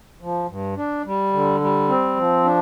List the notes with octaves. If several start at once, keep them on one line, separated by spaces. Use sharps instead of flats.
F3
G2
D4
G3
D3
G3
C4
F3
D4